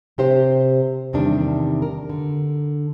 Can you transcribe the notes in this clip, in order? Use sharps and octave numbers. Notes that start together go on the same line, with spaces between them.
C3 G4 C5
E2 C3 D#3 G3 D4
A#4
D3